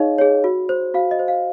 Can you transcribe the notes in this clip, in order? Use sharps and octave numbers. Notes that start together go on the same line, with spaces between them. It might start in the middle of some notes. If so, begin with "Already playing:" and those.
Already playing: D#4 G#4 C#5 D#5 F5
G#4 C#5
F#4
C5
F#4 F5
D#5
C5
F5